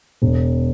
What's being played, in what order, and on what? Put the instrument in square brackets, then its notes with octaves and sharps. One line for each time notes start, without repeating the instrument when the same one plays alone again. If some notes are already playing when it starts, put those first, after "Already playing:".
[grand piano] E1